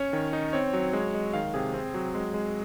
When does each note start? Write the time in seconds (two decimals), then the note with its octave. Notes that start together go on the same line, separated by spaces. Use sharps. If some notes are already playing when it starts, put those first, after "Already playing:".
Already playing: C#4 C#5
0.13 D#3
0.33 D#4
0.53 C4 C#5
0.73 F#3
0.93 G#3
1.14 G#3
1.34 D#3 F5
1.54 C3 G#4
1.74 C4
1.94 F#3
2.15 G#3
2.34 G#3